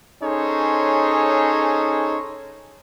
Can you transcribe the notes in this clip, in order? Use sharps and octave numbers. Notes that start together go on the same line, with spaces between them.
C#4 D#4 G#4 A4 C5 C#5